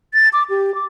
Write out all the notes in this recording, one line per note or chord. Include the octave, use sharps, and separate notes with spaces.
A6
D6
G4
D6